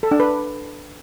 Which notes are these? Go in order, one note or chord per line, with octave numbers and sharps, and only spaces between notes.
A4
D4
B4